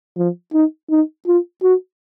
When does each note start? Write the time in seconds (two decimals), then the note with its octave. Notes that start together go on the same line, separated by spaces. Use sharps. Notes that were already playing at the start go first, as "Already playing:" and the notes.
0.17 F3
0.53 D#4
0.90 D#4
1.27 F4
1.63 F#4